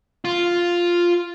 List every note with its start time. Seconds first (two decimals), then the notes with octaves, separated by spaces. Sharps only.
0.25 F4